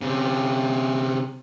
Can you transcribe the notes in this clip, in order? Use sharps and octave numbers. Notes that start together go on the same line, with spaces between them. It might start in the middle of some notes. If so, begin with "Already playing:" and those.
C3 C#4